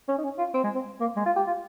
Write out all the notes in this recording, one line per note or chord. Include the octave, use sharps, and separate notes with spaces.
C#4
D#4
C#4
F4
C4
G#3
C4
A#3
G#3
F4
G4
F4